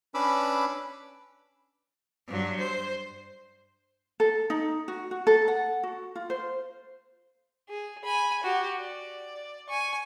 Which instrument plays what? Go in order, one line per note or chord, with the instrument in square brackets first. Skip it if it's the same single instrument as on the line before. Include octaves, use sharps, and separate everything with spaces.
[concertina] C#4 D4 B4 B5 D6 E6
[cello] G2 F#3
C5
[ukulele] A4
D#4
F#4
F#4
A4
F#5
F#4
F4
C5
[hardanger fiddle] G#4
G#5 B5
F#4 G4
D5
G#5 C#6